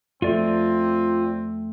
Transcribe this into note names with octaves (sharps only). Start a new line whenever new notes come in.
F2 A3 C4 F4 D5